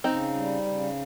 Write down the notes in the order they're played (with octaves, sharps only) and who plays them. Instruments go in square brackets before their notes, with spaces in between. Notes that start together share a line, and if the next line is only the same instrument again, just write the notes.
[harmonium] C#3 [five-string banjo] C4 D#4
[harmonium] G3
C#3